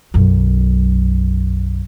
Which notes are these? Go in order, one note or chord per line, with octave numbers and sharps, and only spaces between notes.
B1 F#2